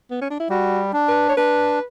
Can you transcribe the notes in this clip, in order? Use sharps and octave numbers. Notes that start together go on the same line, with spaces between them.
B3
C#4
D4
E4
G3 F#4
D4
B4
C#5
D4 B4